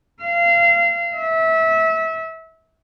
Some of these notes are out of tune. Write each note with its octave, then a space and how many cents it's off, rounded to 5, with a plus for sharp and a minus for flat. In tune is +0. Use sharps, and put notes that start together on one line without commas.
F5 -25
E5 -25